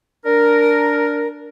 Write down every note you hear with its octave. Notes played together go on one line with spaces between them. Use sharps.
D4 A#4